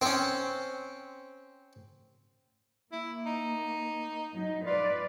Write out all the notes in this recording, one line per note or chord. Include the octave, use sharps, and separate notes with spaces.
C4 C#4
A#3 E4
D#4
F#3 D#4
F4 B4 D5